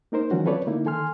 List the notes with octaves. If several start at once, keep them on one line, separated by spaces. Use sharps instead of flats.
A#3 D#4 A#4 C5
D#3 E3 F#3 C#4 F4 F#4
C4 F4 A4 B4 C#5 D5
D3 A#3 D#4 E4
D#3 A4 G#5 C6 F6